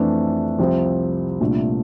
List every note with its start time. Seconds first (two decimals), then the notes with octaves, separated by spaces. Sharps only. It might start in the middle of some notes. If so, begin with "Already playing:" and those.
Already playing: F2 E3 A3 D4
0.59 C2 C3 F3 C4
1.40 C2 A#2 A3 D4 F4